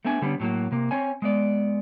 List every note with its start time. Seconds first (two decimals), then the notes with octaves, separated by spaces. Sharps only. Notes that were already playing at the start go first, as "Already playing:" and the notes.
0.05 A3 B3 C4 D4 G#5
0.22 D3 G3 B3 C#4
0.40 A2 F#3 A#3 F#4
0.72 C3 A#3
0.91 C4 C#5 G#5
1.22 G#3 B3 D5